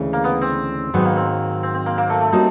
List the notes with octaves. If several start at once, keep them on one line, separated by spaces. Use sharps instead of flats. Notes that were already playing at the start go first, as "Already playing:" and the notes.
Already playing: D2 C#3 E3 G#3
A#3
B3
C4
G#2 D#3 F#3 B3
A#3
C4
C4
C4
A#3
A#3
A3
A3
G3 A#3 C#4 D#4 F#4